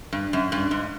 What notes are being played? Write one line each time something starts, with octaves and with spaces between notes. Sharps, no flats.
G2
F#2
G2
G#2